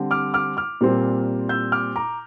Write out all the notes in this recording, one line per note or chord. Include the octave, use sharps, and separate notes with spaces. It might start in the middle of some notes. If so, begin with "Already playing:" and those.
Already playing: D3 G3 C4
D6 F6
D6 F6
D6 F6
A#2 G3 C4
E6 G6
D6 F6
A#5 D6